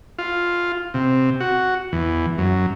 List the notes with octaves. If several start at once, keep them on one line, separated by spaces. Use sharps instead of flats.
F4
C3
F#4
E2
F#2